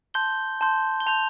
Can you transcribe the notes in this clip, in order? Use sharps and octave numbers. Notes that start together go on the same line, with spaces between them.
A5 C6 G6 G7
A5 C6 G6
G7
A5 C6 G6 F7